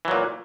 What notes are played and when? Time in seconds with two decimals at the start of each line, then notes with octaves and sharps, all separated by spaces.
0.05 E3
0.08 F#3
0.11 A#2